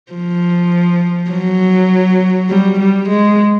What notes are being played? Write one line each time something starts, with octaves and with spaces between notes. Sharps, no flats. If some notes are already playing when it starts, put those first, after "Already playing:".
F3
F#3
G3
G3
G#3